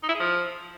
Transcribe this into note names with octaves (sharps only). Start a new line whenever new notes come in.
D#4
E4
G#4
F3